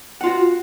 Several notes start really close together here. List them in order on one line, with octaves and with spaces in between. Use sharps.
F#5 F4 F#4